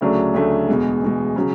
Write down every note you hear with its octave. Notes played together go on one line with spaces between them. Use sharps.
D2 C#3 F#3 A3 D4
D2 C#3 F#3 A3 D4
E2 B2 G#3
E2 B2 G#3
C#3 F#3